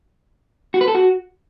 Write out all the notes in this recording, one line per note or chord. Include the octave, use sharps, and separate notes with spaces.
F#4
B4
A4
F#4